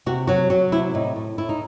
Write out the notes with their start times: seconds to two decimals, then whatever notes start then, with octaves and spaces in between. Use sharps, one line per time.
0.06 C3 F#4
0.27 F#3 F#4
0.50 F#3 F#4
0.72 C3 E4
0.94 A2 D#4
1.16 A2
1.38 A2 E4
1.49 D#4